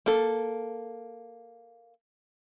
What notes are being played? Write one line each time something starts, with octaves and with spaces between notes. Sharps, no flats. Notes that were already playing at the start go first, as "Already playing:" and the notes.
A#3 A4